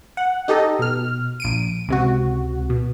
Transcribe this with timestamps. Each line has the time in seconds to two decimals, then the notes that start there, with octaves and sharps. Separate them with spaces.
0.17 F#5
0.48 D#4 G4 A4 D#5
0.79 B2 F6
1.40 A#1 D7 D#7
1.88 C#2 C3 F#4
2.70 B2